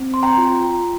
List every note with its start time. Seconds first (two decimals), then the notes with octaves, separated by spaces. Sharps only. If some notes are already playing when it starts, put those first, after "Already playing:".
Already playing: C4
0.14 C6
0.23 G5 A#5
0.38 F4